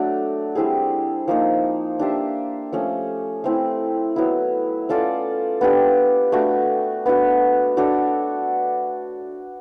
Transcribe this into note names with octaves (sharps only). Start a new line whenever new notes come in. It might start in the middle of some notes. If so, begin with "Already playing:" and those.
Already playing: F#3 A3 D4 F#4
G3 C4 E4 G#4
F3 A#3 D#4
D4 G4 C5 E5
F3 A3 C#4
A3 C4 E4
F#3 B3 E4
C#4 F4 A4 D5
B3 D4 G4
A3 D4 F#4
B3 D4 F#4
D4 F#4 A4 C#5